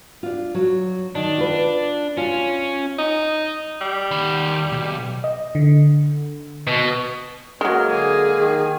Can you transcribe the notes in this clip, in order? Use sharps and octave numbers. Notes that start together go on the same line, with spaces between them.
D4 F4
F#3
D#3 D4
F4 B4
C#4 F4
D#4
G3
D#2 B5
B1
D#5
D3
B2
F#3 G#3 A#3 F6
D3 G#4
D#3